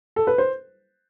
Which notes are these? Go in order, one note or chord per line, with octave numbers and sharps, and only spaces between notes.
A4
B4
C5